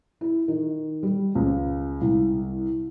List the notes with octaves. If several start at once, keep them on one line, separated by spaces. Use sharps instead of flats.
E4
D#3
G3
C#2
C2